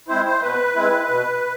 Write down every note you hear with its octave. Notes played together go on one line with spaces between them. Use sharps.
G#3 C4 E4 C5
C5
B2 B4
G#3 C4 E4
B2